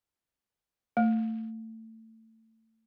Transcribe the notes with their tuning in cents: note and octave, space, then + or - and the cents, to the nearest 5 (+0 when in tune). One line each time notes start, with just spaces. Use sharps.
A3 +25